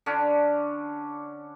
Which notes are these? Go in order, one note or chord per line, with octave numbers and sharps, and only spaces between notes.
D3 C#4 D4